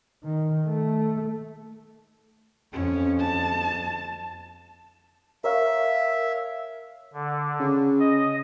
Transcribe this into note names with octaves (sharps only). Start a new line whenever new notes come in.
D#3
A3
F2 C#4
A5
A#4 C#5 E5 F5
D3
C#3
D#5